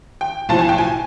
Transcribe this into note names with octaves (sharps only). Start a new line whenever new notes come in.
G5
B1 A2 F3 A5
G#5
G5
G#5